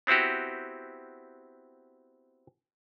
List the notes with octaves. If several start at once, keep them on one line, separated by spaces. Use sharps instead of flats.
B3 C4 E4 F#4 G4